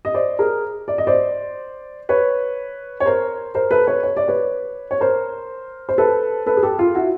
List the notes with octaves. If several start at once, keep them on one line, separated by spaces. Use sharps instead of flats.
D#5
C5 D5
G#4 A#4
D5
D#5
C5 D5
B4 C#5
C#5
A#4 C5
A#4 C5
A4 B4
B4 C#5
C#5
D5
B4 C#5
C#5
A#4 C5
C5
A4 B4
A4 B4
G#4
G4 A4
F4
E4 F#4